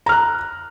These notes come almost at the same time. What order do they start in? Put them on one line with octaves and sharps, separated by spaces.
A#5 F6 F#6